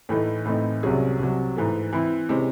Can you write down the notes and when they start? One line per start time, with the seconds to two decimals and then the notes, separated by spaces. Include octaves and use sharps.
0.09 A2 E3 A3 D#4
0.46 A2 E3 A3 C4 D#4
0.83 C2 C3 F#3 C#4 G#4
1.19 C2 C3 F#3
1.56 G#2 E3 A3
1.93 E3 C4 E4
2.29 C3 E3 G#3 C#4